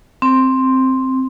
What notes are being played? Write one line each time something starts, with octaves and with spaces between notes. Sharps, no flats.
C4